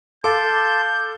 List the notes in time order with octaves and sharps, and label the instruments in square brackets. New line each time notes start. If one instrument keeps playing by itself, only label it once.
[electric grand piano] A4 F5 [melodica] A5 C6 [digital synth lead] D6 [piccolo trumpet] G6